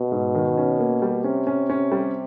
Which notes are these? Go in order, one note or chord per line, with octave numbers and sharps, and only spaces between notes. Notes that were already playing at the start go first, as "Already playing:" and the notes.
Already playing: B2
G#2
D#3
C#4
A#3
G3
C3 C#4
C#4
C#4
G3